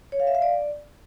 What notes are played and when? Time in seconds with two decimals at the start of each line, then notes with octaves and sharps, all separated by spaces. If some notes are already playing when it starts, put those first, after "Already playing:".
0.12 C#5
0.20 F5
0.27 E5
0.35 F5
0.42 D5